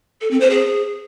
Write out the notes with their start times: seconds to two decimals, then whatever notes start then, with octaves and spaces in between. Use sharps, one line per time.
0.21 A4
0.31 C4
0.41 C5
0.50 G#4